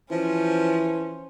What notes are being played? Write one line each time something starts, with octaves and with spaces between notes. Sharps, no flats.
E3 F3 C#4 C5